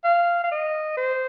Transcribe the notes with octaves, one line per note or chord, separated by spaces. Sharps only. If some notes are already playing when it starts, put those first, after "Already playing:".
F5
F5
D#5
C5